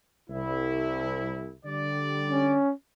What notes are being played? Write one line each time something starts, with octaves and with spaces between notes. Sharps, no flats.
C2 E4
D3 G3 D5
C#4